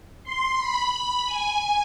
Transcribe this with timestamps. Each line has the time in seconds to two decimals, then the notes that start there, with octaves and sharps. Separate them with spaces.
0.24 C6
0.58 B5
0.93 B5
1.26 G#5